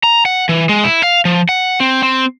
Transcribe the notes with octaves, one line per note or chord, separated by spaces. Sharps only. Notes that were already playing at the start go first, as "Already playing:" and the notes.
A#5
F#5
E3
G#3
E4
F5
F3
F#5
C4
C4